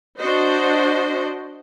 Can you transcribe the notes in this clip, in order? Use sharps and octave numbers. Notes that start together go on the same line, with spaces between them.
D4 F#4 C5 D#5